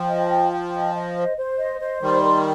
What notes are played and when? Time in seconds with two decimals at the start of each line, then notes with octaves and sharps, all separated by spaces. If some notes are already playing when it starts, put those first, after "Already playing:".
Already playing: F3 G5
0.09 D#5
0.30 G5
0.52 G5
0.73 D#5
0.95 D#5
1.16 C5
1.37 C5
1.58 D#5
1.80 C5
2.02 D#3 G3 C6
2.22 A#4